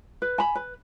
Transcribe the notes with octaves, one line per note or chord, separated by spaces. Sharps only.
B4
G#5 B5
B4